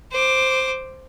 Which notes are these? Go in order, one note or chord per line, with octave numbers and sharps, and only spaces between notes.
C5 D6